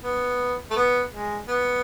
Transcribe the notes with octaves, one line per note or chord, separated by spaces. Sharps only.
B3
A3
B3
G#3
B3